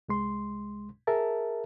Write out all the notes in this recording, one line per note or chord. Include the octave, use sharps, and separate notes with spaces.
C2 G#3 C6
G#4 A#4 E5 A5